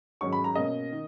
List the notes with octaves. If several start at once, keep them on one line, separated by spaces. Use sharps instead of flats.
G#2 D#3 F#3 C#4 C#6
B5
A#5
B2 A#3 C#4 D#5
D#3